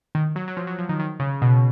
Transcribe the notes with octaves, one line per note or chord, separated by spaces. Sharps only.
D#3
F#3
F#3
F3
F#3
F3
D#3
D#3
C#3
B2